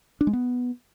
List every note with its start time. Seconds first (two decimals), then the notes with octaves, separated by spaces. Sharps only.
0.21 D4
0.27 G#3
0.33 B3